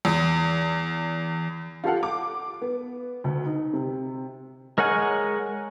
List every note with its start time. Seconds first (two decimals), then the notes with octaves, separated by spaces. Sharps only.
0.05 E2
1.84 F4 G4 A4 F5 F#5
2.03 D6
2.62 B3
3.24 D2
3.46 D#4
3.73 C3
4.78 G#3 A#4 C#5 F#5 G#5